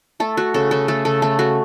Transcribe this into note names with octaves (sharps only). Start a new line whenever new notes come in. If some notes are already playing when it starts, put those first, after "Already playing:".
A3 A4
A3 F#4
C#3 A4
C#3 A4
A3 A4
C#3 A4
A3 A4
A3 F#4